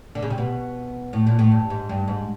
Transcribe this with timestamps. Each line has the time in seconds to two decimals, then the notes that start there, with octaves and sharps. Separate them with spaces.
0.15 D3
0.22 C#3
0.30 C3
0.38 B2
1.13 A2
1.27 A#2
1.39 A2
1.52 G2
1.70 G#2
1.89 G2
2.08 G#2